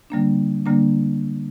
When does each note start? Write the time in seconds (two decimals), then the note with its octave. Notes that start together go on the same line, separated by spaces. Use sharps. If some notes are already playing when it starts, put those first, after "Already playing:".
0.10 D3 G3 A#3 D4
0.66 D3 G3 A#3 D4